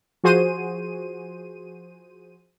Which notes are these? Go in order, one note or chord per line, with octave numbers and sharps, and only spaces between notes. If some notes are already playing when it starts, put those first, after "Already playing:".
F3 F#4 G#4 C5 D#7